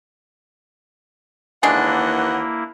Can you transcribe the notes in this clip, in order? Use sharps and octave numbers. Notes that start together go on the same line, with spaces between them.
D#2 C#3 E3 G#3 A#3 D4 E4 F#5